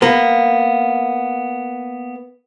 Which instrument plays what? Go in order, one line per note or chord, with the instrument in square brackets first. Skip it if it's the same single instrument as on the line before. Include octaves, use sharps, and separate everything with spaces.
[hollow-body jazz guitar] A#3 B3